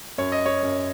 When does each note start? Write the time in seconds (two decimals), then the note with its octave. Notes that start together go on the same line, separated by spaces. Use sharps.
0.18 F#2 C#5
0.32 D#5
0.46 C#5
0.63 F#2